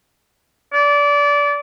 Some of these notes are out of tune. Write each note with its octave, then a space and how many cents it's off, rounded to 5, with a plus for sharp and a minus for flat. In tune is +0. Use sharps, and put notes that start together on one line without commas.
D5 -25